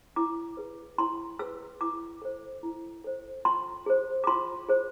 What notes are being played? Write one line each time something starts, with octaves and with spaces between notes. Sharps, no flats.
E4 D6
G#4 B4
E4 C6
G#4 B4 E6
E4 D6
A4 C5
E4
A4 C5
F4 C6
G#4 C5
D6
F4 C6
G#4 C5